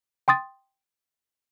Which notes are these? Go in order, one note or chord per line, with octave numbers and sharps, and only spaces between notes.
G5 C6 D#6 A6